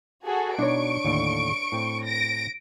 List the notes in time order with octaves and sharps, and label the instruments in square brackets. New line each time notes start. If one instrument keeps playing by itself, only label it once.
[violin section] F#4 G#4 A4
[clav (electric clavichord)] B2 D#4 [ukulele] D4 C#5 [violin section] C#6 D7
[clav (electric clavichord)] D#2 A2 D3
A2 C4
[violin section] A#6 D7